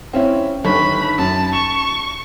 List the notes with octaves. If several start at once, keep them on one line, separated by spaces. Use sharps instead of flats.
C4 C#4 E4
G1 D#3 B5 C#6
F#2 A5
C#6 E7